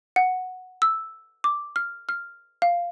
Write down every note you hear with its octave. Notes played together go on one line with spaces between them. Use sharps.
F#5
E6
D6
F6
F6
F5